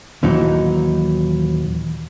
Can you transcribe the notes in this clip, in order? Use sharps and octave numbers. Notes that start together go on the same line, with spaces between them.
D#2 A#2 E3 F#3 D#4